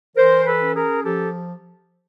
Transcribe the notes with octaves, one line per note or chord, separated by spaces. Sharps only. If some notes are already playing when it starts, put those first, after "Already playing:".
E3 A#4 C5
A4 B4
C#4
G#4 A#4
F3 G4 A4